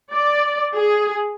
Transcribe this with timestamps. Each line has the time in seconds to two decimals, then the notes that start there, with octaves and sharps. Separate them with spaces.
0.13 D5
0.75 G#4